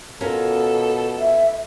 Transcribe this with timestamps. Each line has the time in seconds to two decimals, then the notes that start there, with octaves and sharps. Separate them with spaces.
0.21 B2 C#4 F4 A4 A#4
1.18 E5